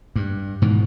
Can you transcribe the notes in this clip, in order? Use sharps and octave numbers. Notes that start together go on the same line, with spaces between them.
G2
G#2 B2 D#3 E3